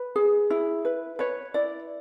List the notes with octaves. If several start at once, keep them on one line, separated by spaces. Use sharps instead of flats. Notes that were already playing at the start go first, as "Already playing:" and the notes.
Already playing: B4
G#4
E4
B4
B4 C#5
E4 D5